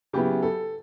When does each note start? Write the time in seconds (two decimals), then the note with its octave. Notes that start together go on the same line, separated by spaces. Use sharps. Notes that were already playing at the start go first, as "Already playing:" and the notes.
0.13 C#3 F#3 B3 E4 G4
0.42 A4